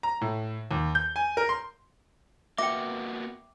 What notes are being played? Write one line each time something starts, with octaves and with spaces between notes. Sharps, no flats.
A#5
A2
D#2
G6
G#5
A#4
C6
A#3 B3 F#4 E5 G5 D6